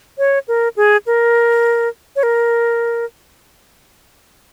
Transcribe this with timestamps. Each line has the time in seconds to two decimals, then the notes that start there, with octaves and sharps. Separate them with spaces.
0.18 C#5
0.48 A#4
0.77 G#4
1.07 A#4
2.16 C#5
2.23 A#4